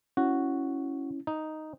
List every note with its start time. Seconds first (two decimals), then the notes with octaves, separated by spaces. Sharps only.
0.17 C#4 E4 F#4
1.27 D#4